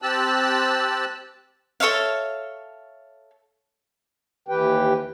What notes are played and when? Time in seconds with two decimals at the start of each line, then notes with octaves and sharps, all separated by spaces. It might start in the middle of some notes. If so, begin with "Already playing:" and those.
0.02 C4 G4 A5 E6 F#6
1.80 A4 C#5 E5 F5
4.48 D#2 E3 G4 B4 G5